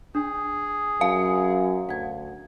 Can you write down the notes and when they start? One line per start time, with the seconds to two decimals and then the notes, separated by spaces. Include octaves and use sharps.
0.15 D4 G#4
1.01 F#2 F5
1.89 D2 F#5 G#6